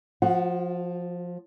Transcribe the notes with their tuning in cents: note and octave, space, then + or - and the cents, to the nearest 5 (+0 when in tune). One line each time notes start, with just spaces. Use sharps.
F3 +10 F#4 -30 F#5 +20